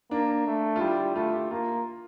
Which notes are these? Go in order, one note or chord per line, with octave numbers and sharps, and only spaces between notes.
A#3 D4
A3
F4
G3 E4
F4
A3 F4
G4
A#3 F4